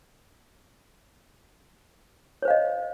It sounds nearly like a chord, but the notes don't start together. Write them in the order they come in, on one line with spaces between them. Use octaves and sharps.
C#5 C5 F5 D#5